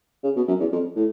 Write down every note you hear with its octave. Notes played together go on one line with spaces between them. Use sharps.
C#3
B2
F#2
E2
F2
A2